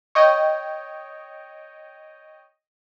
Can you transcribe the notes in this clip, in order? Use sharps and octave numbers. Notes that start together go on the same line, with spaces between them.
C#5 D#5 G5